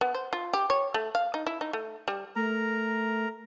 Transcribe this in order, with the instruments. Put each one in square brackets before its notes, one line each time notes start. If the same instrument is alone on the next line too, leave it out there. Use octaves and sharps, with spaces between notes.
[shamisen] B3
C5
F4
G4
C#5
A3
F5
D#4
E4
D#4
A3
G3
[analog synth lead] A3 [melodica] A#4 A#5